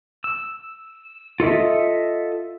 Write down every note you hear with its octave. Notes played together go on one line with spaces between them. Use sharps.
E6
F4 A4 D#5 E5